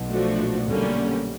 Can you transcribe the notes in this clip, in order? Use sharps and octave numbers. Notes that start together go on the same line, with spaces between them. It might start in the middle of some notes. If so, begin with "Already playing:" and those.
Already playing: B1 B2
F3 A3 D4 F#4
A#2
B1 B2 D3 G3 A#3 C#4